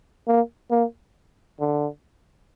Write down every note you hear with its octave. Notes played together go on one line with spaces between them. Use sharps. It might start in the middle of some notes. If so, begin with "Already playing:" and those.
A#3
A#3
D3